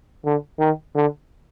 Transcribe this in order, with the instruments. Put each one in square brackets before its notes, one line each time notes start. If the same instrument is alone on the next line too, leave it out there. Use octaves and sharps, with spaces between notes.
[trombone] D3
D#3
D3